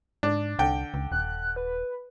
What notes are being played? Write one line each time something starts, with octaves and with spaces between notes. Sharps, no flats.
G#2 D4
C2 D3 G5
C#2
D#1 F#6
B4